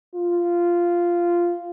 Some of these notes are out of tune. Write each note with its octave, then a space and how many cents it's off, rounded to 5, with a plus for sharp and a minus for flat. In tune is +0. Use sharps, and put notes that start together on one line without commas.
F4 -10